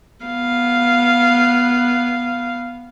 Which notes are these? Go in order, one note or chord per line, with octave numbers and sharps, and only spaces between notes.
B3 F5